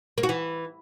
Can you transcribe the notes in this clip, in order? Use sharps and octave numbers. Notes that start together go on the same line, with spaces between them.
A#3
F#4
E3